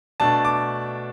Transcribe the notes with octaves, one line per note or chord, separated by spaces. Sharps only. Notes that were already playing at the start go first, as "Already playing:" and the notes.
B2 A3 D4 A5
D6